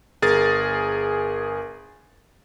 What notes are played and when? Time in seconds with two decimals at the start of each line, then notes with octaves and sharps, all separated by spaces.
0.22 G1 G#4 A#4 G#5 A6